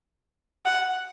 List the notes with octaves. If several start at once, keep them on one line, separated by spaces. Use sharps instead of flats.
F#5